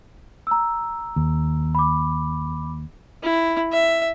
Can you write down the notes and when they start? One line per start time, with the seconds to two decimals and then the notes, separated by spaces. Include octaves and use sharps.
0.47 A#5 E6
1.16 D#2
1.75 B5 D6
3.23 E4
3.72 E5